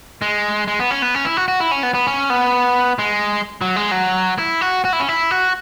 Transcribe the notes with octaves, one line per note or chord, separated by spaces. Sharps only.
G#3
G#3
B3
C#4
B3
C#4
E4
F#4
F#4
E4
C#4
B3
B3
C#4
B3
G#3
F#3
G#3
F#3
E4
F#4
F#4
E4
C#4
E4
F#4